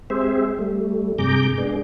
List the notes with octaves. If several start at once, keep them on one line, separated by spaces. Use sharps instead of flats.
G#3 C4 G4 G#4 C5 E5
G3 A3
G2 C3 G#4 A#5 D6 G6
G#3 B3 D4 G#4